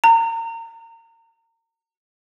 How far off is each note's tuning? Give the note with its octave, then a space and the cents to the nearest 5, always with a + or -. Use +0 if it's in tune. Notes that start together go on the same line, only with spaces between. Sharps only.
A#5 -30